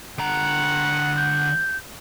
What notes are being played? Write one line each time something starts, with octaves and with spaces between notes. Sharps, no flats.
D3 F#5 A#5
G6